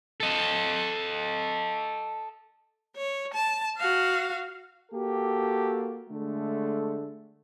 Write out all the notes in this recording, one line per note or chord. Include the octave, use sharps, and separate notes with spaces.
A4 D#5
C#5
A5
F#4 F5
A#3 F#4 G4 A4
D3 G#3 A3